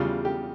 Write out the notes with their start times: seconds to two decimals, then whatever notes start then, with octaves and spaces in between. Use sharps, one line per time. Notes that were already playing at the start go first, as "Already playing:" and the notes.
Already playing: E2 C#3 G3 F4
0.25 G4